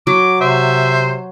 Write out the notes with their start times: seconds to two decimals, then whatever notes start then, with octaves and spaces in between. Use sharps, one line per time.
0.07 F#3 D6
0.41 C3 C5 E5